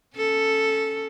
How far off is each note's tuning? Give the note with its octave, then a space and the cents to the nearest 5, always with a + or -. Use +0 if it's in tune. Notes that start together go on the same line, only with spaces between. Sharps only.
C#4 +0 A4 +0